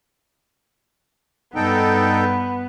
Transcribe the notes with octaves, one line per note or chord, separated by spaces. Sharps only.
G2 B3 D#4 A4 G5